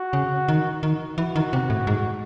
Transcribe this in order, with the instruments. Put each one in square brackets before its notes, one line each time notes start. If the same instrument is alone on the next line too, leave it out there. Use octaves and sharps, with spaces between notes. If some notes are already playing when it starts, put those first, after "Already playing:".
Already playing: [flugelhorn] F#4
[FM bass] C#3
D#3
D#3
[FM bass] E3 [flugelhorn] F#4
[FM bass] D#3
C3
A2
G#2